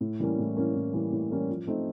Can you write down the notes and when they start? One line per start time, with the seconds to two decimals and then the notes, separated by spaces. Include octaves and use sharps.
0.01 A2
0.20 E3 G3 A#3 C#4
0.39 A2
0.57 E3 G3 A#3 C#4
0.75 A2
0.93 E3 G3 A#3 C#4
1.12 A2
1.31 E3 G3 A#3 C#4
1.49 F3
1.67 A3 C4 D#4